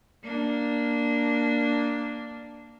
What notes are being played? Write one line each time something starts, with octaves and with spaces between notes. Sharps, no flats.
A#3 D4